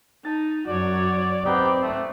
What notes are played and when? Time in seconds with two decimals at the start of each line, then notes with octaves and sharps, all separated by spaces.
0.25 D#4 A5
0.67 F#2 F#3 F#4 C#5 D5
1.45 B3 C4 D#4 G4 D5
1.83 A3